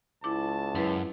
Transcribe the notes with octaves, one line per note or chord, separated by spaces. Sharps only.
C#2 E4 A5 D6
F#2 E4 B4